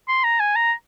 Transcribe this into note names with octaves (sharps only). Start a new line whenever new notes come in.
C6
A#5
G#5
A#5